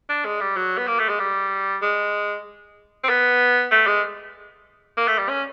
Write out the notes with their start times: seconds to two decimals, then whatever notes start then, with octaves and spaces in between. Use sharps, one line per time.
0.09 D4
0.25 G#3
0.41 G3
0.56 F#3
0.78 B3
0.87 A#3
0.99 A3
1.09 G#3
1.20 G3
1.82 G#3
3.03 C4
3.09 B3
3.71 A3
3.87 G#3
4.97 A#3
5.08 A3
5.18 G3
5.29 C#4